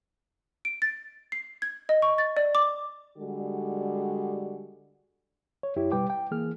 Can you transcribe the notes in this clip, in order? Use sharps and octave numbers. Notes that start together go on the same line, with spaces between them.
D7
A6
C7
G#6
D#5
C#6
A6
D5
D6
D3 G3 G#3 F#4
C#5
F#2 E4 G4 C#5
B2 G3 B4 G5 D6
G5
E3 A#3 G#4 F6